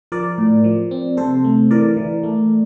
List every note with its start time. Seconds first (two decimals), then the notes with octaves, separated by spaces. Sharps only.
0.12 F3 A#4 D5
0.38 A2
0.64 F3
0.91 C4
1.17 C3 A4 C5
1.44 A3
1.71 E3 A#4 D5
1.97 E3
2.23 A3